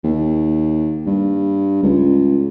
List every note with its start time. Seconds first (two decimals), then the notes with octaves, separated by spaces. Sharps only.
0.04 D#2
1.06 G2
1.83 C#2